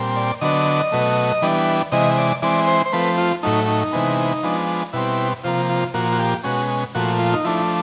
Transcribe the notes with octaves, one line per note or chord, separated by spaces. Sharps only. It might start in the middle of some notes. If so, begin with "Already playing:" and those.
Already playing: A#2 G3 C4
D5
D3 F#3 B3 D4 D#5
B2 F#3 A3
E3 G3 B3 D4
C3 E3 G#3 D#5
D5
E3 G#3 C4 D5
C5
C5
F3 A3 C4 B4
F4
A2 F#3 A3 D#4
D#4
C3 E3 G#3 B3
F3 G#3 B3 D4
B2 G3 C4 E4
C3 F3 A#3 F4
F4
A#2 F3 A#3 F#4
F#4
G4
B2 G#3 C#4 F#4
A#2 F3 A3 F#4
F4
D#4
F3 A3 D4 E4